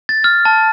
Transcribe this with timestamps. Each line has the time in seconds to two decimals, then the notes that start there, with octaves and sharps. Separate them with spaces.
0.09 A6
0.24 F6
0.45 A5